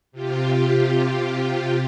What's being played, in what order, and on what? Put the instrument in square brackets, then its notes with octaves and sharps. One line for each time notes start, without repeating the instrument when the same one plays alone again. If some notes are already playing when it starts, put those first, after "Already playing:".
[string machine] C3 F4 G4